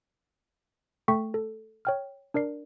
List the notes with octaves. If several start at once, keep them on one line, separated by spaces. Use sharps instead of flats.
A3 A4 G5 C#6 B6
A4
C#5 G5 F6
D4 A#4 D5 C7